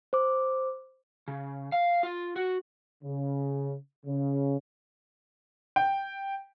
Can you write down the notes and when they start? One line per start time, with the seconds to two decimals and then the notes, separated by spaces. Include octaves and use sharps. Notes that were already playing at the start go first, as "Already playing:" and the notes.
0.13 C5 D6
1.28 C#3
1.72 F5
2.03 F4
2.36 F#4
3.03 C#3
4.06 C#3
5.76 G5